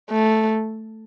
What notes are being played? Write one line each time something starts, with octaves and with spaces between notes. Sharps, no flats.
A3